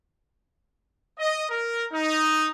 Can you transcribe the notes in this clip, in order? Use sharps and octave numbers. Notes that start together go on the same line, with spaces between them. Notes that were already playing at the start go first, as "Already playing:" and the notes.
D#5
A#4
D#4